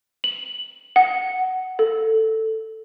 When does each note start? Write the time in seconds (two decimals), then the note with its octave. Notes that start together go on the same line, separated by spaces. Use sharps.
0.24 F#7
0.96 F#5
1.79 A4